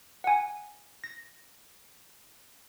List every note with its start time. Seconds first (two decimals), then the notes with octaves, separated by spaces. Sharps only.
0.24 F#5 G#5
1.04 A#6